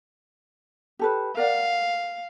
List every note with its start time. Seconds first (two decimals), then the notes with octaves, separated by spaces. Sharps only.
0.99 G4 A4 B4
1.37 A#4 D5 F5 F#5